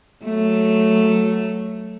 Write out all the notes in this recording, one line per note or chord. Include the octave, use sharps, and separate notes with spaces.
F#3 A3